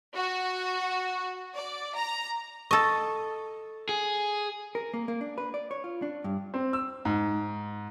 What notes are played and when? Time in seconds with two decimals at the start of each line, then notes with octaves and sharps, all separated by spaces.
0.16 F#4
1.55 D5
1.96 A#5
2.71 A4 D#5 C#6 A6
3.89 G#4
4.75 A#4
4.94 A#3
5.08 A#3
5.21 D4
5.38 B4
5.54 D5
5.71 C#5
5.84 F4
6.02 D4
6.24 G2
6.54 C4
6.73 E6
7.05 G#2